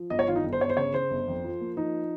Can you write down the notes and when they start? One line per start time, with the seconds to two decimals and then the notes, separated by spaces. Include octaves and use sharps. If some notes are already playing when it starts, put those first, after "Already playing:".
Already playing: F3
0.10 G1 D#5
0.19 C#5
0.27 D#3 F4
0.36 D#4
0.43 G1
0.53 C5
0.61 G1 C#5
0.69 C5
0.77 C#3 C#5
0.94 C#3 C5
1.11 G1
1.28 F2
1.44 F3
1.61 A#3
1.76 F3 D#4